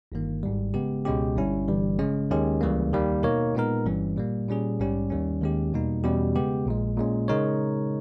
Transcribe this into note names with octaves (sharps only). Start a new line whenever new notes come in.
G1 G2 D#3 A#3
G#1 G#2 G3
C#3 G#3 B3 G4
C#2 B2 G#3 C#4 G4
G1 G2 G3 C#4 E4
G1 G2 E3 G3
C#3 G#3 C#4
D#2 D#3 G#3 C#4 G4
C#2 C#3 E3 G3 A#3
D#2 D#3 G3 A#3
B2 A#3 D#4 A#4 C#5
A#2 G#3 B3 D#4 A#4
G1 G2 E3 G3 C#4
A#2 G3 A#3
A#2 G3 C#4 G#4
A#1 G#2 G3 C#4 G4
D#2 D#3 G3 C#4
D#2 D#3 G#3 C#4 G4
E2 B2 G3 A#3 D#4
E2 B2 G3 C#4 G4
C#3 G#3 B3 G4
A#1 A#2 G#3
A#2 G#3 C#4
C#3 G#3 D#4 A#4 C#5